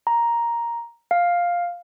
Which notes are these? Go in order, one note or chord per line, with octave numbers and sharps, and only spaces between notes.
A#5
F5